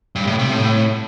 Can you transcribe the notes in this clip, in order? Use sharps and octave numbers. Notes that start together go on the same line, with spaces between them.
G2
A2
C3
A2
A2